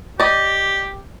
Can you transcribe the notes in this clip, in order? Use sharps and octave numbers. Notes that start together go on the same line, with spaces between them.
G4 D5 D#5